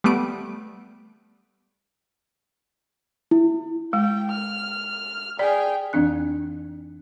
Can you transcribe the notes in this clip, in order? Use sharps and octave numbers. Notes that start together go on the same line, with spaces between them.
G3 A3 B3 F#6 D7
E4
G#3 G5
F6
G#4 D5 G5
F2 E3 C4 D4 F#6